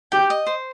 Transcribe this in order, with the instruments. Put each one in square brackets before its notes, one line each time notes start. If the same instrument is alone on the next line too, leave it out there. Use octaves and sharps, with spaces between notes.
[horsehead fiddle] G4 [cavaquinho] G5
[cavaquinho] D#5
C5